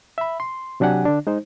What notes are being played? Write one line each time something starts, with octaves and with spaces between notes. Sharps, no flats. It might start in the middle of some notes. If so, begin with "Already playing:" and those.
E5 B5
C6
C3 F#3 D4 G4 F#5 G#5
D3 D4
G#3 D#4 C5